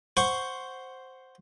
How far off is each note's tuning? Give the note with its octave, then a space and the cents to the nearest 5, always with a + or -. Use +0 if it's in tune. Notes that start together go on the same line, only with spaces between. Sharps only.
C5 +0 F#5 +0 C#6 +0